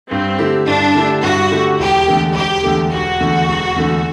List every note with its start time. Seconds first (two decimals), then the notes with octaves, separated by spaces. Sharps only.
0.11 G2 C4
0.38 D3 A3 E4 G4
0.67 G2 D4
0.95 D3 A3 E4 G4
1.23 G2 F#4
1.51 D3 A3 E4 G4
1.79 E1 G4
2.08 E2 D3 A3
2.35 E1 G4
2.63 E2 D3 A3
2.92 E1 F#4
3.20 E2 D3 A3
3.49 E1
3.76 E2 D3 A3